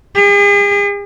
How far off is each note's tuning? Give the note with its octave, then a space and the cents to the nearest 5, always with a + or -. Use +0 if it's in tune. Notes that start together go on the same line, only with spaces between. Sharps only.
G#4 -45